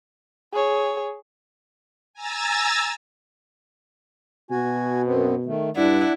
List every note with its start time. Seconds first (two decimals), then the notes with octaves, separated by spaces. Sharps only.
0.53 G#4 C#5
2.14 G#5 A#5 E6 A6
4.51 B2 F#4 G#5
5.06 F#2 B3 C4
5.46 D#3 A3
5.76 G2 D4 E4 D5 F#5